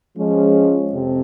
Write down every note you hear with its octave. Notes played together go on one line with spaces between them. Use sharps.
F3 G#3 C#4
F2 C3